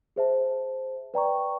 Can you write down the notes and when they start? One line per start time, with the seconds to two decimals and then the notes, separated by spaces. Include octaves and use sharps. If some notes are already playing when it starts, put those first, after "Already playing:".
0.16 G#4 C5 E5 A5
1.14 B4 D5 G5 A#5 C#6